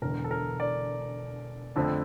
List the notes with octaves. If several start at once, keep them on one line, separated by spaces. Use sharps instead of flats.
E1 E2 D3 A#4
A4
A#4
D5
F2 D3 A3 C4